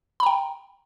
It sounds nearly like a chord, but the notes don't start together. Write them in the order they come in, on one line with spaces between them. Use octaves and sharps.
B5 A#5 G5